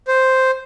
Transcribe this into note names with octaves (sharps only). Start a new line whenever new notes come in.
C5